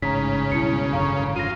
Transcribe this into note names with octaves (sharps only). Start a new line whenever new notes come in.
A1 G#2 C#3 A#5 B6
C#2 G2 B2 E4 C#7
G#1 F#2 D3 F5 A#5 C#6
F4 A#6 D#7